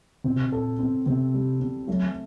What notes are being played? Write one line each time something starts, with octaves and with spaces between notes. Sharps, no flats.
A#2 C4
C3
A#2
A4
C4
C3 C4
G3
C4
F#3 A3